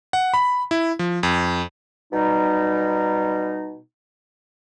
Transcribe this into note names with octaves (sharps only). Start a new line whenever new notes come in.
F#5
B5
E4
F3
F2
B2 G3 D#4